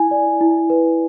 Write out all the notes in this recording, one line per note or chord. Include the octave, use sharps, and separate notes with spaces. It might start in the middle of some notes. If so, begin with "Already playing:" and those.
Already playing: E4 G#5
D5
E4
B4